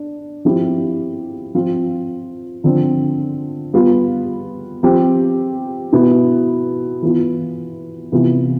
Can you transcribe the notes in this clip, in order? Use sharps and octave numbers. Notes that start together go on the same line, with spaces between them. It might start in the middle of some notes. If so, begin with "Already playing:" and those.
Already playing: D4
F3 C4 E4 G4
F3 C4 F4
D3 F3 C4
G3 B3 F4
F3 C4 G4
B2 B3 E4
E3 B3 F4
C3 E3 B3 F4